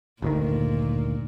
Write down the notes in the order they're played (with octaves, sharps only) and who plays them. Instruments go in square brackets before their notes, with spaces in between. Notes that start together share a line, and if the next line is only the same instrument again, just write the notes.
[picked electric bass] G1 D2 D#3 [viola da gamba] A#2